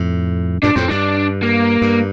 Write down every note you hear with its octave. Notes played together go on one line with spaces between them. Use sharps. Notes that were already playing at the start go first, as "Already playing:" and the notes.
Already playing: F2 A2
G2 A#2 D4
F2 A2 C4
G2 D4
A#3
G2